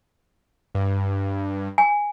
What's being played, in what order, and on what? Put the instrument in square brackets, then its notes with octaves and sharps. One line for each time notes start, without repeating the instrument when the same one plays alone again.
[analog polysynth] G2
[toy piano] G#5